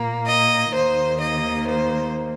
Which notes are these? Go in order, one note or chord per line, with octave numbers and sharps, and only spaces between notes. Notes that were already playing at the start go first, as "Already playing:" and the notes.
Already playing: A#2 A#3
D#5
D#2 D#3 A#3 C5
D#5
C5